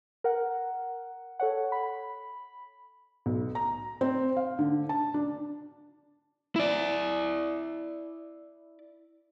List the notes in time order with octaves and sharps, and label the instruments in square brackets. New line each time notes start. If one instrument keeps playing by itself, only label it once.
[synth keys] A#4 F#5
A4 C#5 F#5
B5
[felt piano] B1
A#5
C4
F5
D3
A5
D4
[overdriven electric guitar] E4 D5